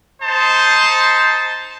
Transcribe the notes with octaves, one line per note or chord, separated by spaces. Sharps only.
D#4 C5 A5